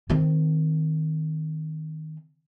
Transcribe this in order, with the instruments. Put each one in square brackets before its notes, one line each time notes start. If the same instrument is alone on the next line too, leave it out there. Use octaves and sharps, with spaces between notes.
[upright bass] D#3 C4